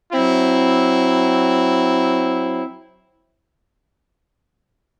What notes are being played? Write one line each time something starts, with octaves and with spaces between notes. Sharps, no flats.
F#3 C4 E4